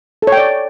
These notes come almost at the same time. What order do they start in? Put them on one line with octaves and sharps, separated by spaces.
A4 C#5 G5 D5